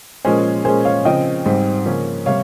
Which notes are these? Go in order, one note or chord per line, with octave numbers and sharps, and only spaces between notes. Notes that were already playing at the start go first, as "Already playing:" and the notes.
A#2 F3 G#3 C#4 G#4 C5
A#2 G#3 C#4 G#4 C5
C#5 F5
C#3 F3 C4 D#5 G5
G#2 G3 C4
C#3 F3 A#3 C#4
C3 G3 C#5 F5